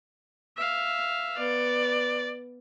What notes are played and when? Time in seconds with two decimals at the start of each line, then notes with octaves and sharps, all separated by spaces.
0.57 E5 F5
1.39 B3 D5